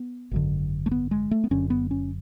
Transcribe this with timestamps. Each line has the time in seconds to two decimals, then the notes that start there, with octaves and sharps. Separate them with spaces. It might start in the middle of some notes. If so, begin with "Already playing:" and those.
Already playing: B3
0.31 G#1 F#2 D3
0.86 A3
0.91 B3
1.11 G#3
1.31 A3
1.44 B3
1.51 F#1 F#2 D3 C#4
1.70 B3
1.91 C#4